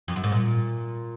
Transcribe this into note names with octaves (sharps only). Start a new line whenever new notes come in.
F2
F#2
G#2
A#2